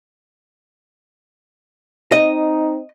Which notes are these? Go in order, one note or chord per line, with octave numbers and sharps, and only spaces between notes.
C4 D#4 D#5